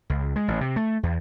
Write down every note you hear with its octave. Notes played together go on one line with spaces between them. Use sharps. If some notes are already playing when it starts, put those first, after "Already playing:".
C#2
G#3
A1
C3
A3
E2